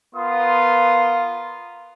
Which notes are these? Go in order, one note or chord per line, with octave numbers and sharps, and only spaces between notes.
B3 F4 A#4 C6 D#6